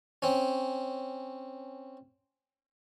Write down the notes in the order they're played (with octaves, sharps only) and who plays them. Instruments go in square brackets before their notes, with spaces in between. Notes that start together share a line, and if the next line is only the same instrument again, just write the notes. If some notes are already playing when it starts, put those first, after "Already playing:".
[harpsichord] C4 C#4